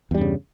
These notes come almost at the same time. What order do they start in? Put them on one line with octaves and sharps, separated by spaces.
E2 G3 G2 C#3